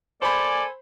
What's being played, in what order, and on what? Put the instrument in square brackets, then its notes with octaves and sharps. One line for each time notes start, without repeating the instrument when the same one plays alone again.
[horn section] A#3 A4 G#5 [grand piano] C5 B5 [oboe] D5